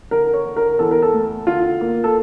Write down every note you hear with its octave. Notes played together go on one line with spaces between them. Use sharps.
D3 A#4
C#5
D3
A#4
E2 A4
A#4
A4
A3
D3 F4
A#3
A4